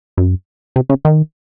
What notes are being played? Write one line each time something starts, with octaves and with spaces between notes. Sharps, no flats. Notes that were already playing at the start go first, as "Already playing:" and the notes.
F#2
C3
C#3
D#3